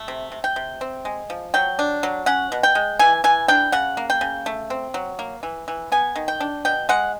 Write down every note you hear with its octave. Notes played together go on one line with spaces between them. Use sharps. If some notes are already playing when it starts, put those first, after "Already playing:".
Already playing: A3
C3
C3
G5
C3
C4
G#3
F3
F#3 G5
D4
F#3
C#4 F#5
B2
G5
G#3
E3 G#5
E3 G#5
D4 G5
C#3 F#5
A#3
G5
C#3
A3
C4
F#3
A#3
E3
E3
B3 G#5
D#3
G5
D4
B2 G5
G#3 F#5